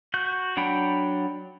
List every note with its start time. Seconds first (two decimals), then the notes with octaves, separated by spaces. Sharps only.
0.14 F#4 G6
0.57 F#3 D4 F#5 G5 B5